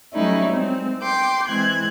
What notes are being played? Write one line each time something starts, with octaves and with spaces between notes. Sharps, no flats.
F#3 G3 A3 C#4 D#4 E4
G#3 C4
G5 C6 D6
E3 G#3 C4 F#6 G#6